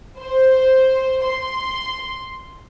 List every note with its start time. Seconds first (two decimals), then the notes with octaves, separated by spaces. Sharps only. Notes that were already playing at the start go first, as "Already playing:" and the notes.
0.20 C5
1.24 C6